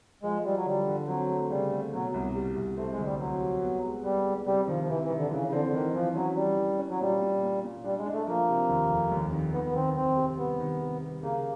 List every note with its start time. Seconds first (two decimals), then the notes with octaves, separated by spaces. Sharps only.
0.23 F3 G#3
0.45 F3 G3
0.56 F#3
0.65 D3 G3
0.88 D3
1.07 F#3 C4
1.29 A3
1.50 C#3 G3
1.72 A3
1.93 B2 F#3
2.14 C2 F#3
2.35 G3
2.56 C2
2.77 A3 C4
2.91 G#3
2.98 D2
3.05 G3
3.19 F#3 C4
3.41 G3
3.61 B3
3.84 G#3
4.04 G3 B3
4.25 G#3
4.46 C3 G3
4.68 D#3 F3
4.83 F3
4.89 C3 E3
5.03 E3
5.10 D#3
5.17 D3
5.31 C#3 E3
5.48 C#3
5.52 D3 C4
5.65 D3
5.73 D#3 E3
5.94 E3 F3
6.16 F#3 C#4
6.36 G3 C#4
6.58 E3
6.79 C#4
6.90 F#3
7.00 A#2 G3
7.21 A#2
7.43 A#3
7.63 A#2
7.84 G3 D4
7.98 G#3
8.06 D4
8.12 A3
8.27 F3 A#3
8.49 C3
8.69 D#2
8.90 F1
9.11 D#2
9.32 D#3
9.53 D#3 B3
9.64 B3
9.75 D#3 C4
9.96 D#3 C4
10.17 C3
10.38 G3 B3
10.60 D#3
10.81 C3
11.02 G3
11.23 C#3 A#3